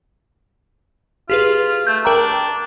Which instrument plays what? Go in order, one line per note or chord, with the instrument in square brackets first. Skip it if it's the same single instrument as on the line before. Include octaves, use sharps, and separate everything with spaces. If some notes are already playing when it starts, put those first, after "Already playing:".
[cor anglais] F4 [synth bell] G4 G#4 B4
[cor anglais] A3 [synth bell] G6
[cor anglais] D4 [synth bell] A#4 G5 A#5